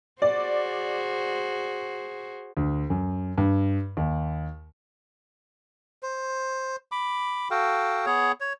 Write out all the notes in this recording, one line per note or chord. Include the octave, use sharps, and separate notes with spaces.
F#4 G#4 C5 D5
D2
F#2
G2
D#2
C5
B5 D6
F#4 A4 F5 G5
B3 G#4 C#5
C#5